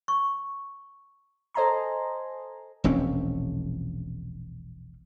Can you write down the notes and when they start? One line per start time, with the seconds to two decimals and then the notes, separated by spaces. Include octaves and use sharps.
0.08 C#6
1.54 A4 C5 D#5 G#5 A#5 C6
2.84 E1 A#1 C4 C#4